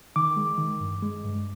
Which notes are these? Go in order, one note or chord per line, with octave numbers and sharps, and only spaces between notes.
D#3 D6
G#3
D#3
G2
G#3
G2